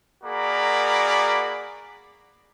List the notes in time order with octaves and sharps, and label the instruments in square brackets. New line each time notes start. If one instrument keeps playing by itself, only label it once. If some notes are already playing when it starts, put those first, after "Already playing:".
[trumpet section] A#3 F#4 G#4 A#4 D5 B5